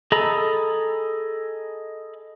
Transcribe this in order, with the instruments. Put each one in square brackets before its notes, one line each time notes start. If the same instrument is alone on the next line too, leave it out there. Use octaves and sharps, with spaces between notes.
[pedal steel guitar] G#4 A4 D#5 A#5 B5